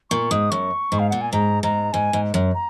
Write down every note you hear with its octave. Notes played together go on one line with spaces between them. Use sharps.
A#2 C#6
G#2 D#6
F#2 C#6
G#2
F5
A#2 F#5
G#5
G#2 A#5
G#2 A#5
G#2 G#5
G#2
F#2
A#5